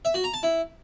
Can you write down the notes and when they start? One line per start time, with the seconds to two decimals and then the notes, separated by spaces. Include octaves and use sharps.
0.05 E5
0.14 F#4
0.24 A#5
0.33 A5
0.43 E4